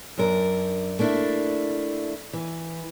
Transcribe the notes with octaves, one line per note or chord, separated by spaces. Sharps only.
F#2 D4 A#4
A3 A#3 D4 E4
E3